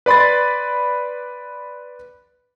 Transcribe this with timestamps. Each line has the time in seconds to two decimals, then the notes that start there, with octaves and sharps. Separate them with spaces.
0.06 B4 D5 B5 C6 A6